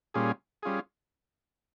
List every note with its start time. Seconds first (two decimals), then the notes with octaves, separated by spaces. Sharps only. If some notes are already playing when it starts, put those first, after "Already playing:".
0.14 A#2 G3 C#4 F4 G#4
0.63 G3 C#4 F4 G#4